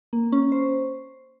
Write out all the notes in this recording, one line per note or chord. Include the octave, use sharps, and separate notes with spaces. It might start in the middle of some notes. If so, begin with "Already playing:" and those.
A#3
C#4
C5